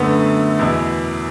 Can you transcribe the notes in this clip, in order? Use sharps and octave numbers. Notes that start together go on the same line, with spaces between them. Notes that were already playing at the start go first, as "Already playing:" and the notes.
Already playing: F#2 D3 A3 B3
E2 B2 E4